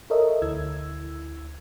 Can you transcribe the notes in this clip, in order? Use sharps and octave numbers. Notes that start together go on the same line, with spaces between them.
A4 A#4 C#5 D#5 E5
D2 E4 E6 G#6